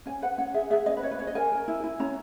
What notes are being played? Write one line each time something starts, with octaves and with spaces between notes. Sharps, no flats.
C#4 G#5
B4 F#5
C#4 F#5
G#4 E5
G#4 E5
C#4 D#5
B4
C#4 C#5
B4
C#4 C#5
D#5
A#4 G#5
A#4
E4
E4
C#4 A#5